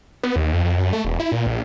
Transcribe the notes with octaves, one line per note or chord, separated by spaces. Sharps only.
B3
D#2
F2
F2
F#2
A3
E1
E4
A#2
A#1